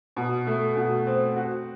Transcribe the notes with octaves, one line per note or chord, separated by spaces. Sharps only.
B2
A3
B2
C4
F#4